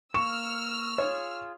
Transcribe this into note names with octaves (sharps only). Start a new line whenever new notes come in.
A#3 C#6 E6 F6 E7
F4 G#4 C#5